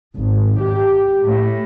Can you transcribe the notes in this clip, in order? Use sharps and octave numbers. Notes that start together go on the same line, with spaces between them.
G#1
G4
A2